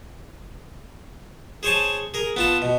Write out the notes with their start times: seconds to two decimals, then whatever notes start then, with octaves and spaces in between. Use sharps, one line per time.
1.63 G#4 C5 C#5 G#5 A5
2.14 G#4 A#4
2.36 B3 F4 A5
2.62 B2